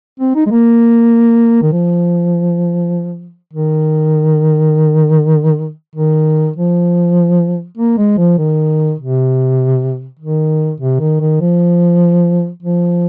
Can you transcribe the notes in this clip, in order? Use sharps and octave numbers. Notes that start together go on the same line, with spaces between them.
C4
D#4
G#3
A#3
D#3
F3
D#3
D#3
F3
A#3
G#3
F3
D#3
C3
D#3
C3
D#3
D#3
F3
F3